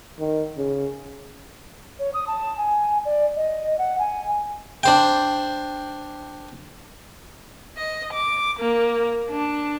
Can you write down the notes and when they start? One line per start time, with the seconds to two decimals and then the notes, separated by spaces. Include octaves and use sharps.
0.19 D#3
0.57 C#3
1.99 C#5
2.14 D#6
2.27 A5
2.57 G#5
3.05 D5
3.36 D#5
3.78 F#5
3.98 G#5
4.83 D4 C5 G5
7.77 D#5
8.12 D6
8.59 A#3
9.30 D4